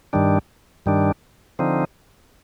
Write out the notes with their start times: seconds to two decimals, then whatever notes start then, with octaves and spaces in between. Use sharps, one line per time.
0.13 G2 D#3 G3 D4
0.86 G2 D#3 G3 D4
1.59 D3 F3 C4 D#4